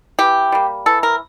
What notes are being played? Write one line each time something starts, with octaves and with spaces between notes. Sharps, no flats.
E3 G4
G3 A#3
E3 A4
A#4